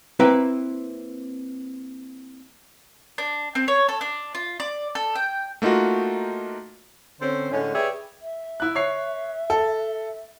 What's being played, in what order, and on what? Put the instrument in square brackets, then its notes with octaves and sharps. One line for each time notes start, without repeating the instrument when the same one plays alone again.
[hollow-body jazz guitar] A#3 C4 E4 B4 G5
[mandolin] D4
C4
C#5
A4
D4
F4
D5
A4
G5
[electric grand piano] A3 A#3 D#4 F4 F#4
[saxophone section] D3 C4 C#4 A4 C5
A2 D3 G#3 A3 C#4
G4 G#4 B4 C#5 D5 E5
[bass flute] E5
[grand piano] E4 F#6
C#5 C7
A4